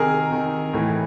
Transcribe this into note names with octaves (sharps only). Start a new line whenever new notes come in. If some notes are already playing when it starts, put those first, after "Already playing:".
Already playing: C3 D#3 G#4 A#4
C3 D#3
A2 E3